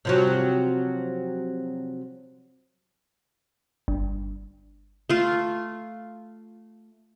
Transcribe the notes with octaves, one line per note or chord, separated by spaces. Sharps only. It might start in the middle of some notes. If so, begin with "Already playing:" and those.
C3 F3 F#3
G1
A3 F4